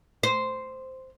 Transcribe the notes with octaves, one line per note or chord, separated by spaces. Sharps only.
C5